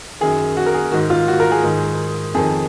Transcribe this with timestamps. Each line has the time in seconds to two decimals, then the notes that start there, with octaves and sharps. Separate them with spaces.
0.21 F#2 D#3 G#4
0.57 F#4
0.66 A#4
0.74 G#4
0.92 G#2 D#3 F#4
1.10 F4
1.28 F#4
1.40 A#4
1.52 G#4
1.64 G#2 D#3
2.34 F2 D#3 G#4